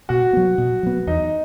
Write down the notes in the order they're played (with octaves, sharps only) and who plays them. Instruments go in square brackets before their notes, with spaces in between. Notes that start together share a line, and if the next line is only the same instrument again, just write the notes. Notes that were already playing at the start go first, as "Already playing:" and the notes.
[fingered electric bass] B2 [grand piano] F#4
[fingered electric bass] F#3 B3
B2
F#3 B3
[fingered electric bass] E2 [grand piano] D#4